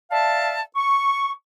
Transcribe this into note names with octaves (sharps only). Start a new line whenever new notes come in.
D5 E5 F5 A5
C#6